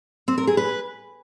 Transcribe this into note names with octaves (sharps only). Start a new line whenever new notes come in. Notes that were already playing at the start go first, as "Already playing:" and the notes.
C4
A#4
G#4
B4